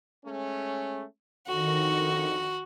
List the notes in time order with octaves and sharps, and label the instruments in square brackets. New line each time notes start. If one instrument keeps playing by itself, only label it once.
[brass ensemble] G#3 A3 C#4
[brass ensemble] F2 D3 [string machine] D#3 C#6 A#6 [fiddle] F#4